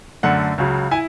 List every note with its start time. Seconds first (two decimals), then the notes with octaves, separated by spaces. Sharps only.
0.23 F#2 D3 A3 F#5
0.58 C#2 C#3 F#3
0.91 E4 G#5